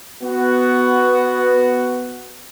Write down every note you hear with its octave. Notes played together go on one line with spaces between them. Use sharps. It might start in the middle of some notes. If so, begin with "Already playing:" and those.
B3 F#4